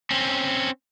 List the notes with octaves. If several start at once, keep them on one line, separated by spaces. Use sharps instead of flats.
C4 C#4